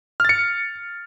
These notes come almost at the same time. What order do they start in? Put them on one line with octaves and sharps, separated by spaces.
F6 A6 C#7